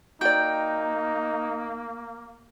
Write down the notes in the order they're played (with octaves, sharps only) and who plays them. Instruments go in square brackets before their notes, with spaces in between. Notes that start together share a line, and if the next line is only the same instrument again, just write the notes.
[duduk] A#3 [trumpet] D#4 [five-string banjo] F#4 D5 [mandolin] G5